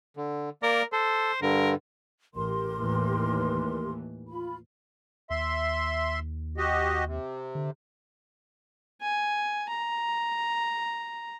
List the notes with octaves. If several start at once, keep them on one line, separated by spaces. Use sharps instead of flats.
D3
A#3 A#4 D5
A4 C5
G2 D3 A#4
A1 G4 A#4 C6
D#2 A2 E3
F4 B5
D#2 E5 C6
F#4 G4 D#5
C3
D3
G#5
A#5